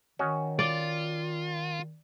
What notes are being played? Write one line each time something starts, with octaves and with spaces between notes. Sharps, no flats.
D#3 C#4 F#4 D#5
F4 D5